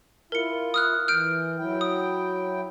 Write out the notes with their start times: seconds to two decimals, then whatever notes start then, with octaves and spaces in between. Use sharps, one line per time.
0.32 E4 F4 A#4 C#7
0.74 D#6 F6 F#6
1.08 E3 F6 G6 D7
1.58 F#3 E4 G5
1.81 D#6